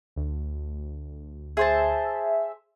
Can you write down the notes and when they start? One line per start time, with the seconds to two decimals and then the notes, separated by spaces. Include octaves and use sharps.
0.16 D2
1.57 G#4 C5 E5 A5